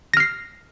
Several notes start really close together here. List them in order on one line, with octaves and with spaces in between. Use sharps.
A#6 F6 C7